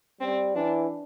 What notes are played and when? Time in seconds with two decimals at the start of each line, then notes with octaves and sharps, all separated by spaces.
0.21 G3 C4
0.56 E3 D4